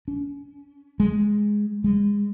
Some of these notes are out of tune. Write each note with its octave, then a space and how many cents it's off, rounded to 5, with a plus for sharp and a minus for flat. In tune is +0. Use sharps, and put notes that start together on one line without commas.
C#4 +30
G#3 +0
G#3 -25